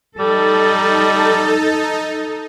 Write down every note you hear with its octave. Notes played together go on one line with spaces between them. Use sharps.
G3 D#4 A4